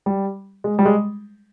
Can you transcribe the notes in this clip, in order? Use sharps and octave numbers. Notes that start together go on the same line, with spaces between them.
G3
G#3
G3
G#3